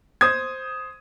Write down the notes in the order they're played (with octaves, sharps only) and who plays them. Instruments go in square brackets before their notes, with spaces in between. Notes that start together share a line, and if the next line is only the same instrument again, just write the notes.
[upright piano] C5 D#6 G#6